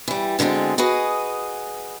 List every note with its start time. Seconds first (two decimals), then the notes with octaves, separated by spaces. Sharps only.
0.08 E3 G3
0.39 B2 D3 G3 G#3 C4
0.78 F#4 G#4 B4 D#5